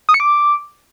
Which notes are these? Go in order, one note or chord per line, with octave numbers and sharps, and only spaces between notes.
D#6
C#7
D6